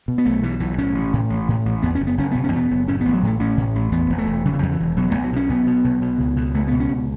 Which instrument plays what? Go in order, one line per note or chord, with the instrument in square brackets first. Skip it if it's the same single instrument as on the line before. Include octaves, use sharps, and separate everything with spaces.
[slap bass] B2
B3
B1 A3
B2 E3
B1 E3
A2 C#4
A1
A2
A1
A2
A1
E2 B3
C#4
F#1
B3
F#1 C#4
B2 B3
C#4
E2 B3
F#1
A2 C#4
A1 B3
F#3
A2 A3
A1 C#4
A2
A1
E2 B3
E1
A3
E1
C#3 F#3
E3
E2 F#3
E3
E1
B2 F#3
B1 A3
F#3
B2 C#4
B1 B3
B2
B1
B2
C#2
B2
C#2 A3
B2 B3
C#4
C#2